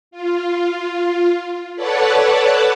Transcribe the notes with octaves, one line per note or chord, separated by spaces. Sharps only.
F4
A4 B4 C#5 D5 F#5 A5